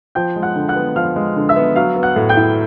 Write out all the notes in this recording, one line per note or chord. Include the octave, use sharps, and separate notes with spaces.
F3 G5 G6
G#3
F#5 F#6
D3
F#5 F#6
B3
F3 F5 F6
G#3
D3
E5 E6
B3
F#3 F5 F6
B3
F#5 F#6
A2
G5 G6
E4